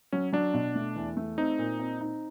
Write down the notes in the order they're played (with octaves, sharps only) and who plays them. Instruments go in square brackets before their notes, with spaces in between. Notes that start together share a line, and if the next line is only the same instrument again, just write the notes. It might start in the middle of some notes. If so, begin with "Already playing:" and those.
[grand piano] F#3 [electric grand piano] C#4
[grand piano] F#3 [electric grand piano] D4
[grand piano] B2
A3
E2
A3
[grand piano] C4 [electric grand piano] D#4
[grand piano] A#2
C4
D#4